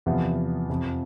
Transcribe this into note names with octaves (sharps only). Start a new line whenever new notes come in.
E2 C3 F3 B3
F2 C3 F3 C4 F4